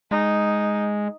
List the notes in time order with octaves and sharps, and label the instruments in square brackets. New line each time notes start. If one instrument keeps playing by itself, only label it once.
[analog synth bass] G#3 [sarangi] D#4